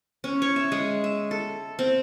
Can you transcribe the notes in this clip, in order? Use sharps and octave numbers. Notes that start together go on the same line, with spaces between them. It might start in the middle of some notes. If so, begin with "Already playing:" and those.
C#4
C#5
E5
G#3
E5
A4
C4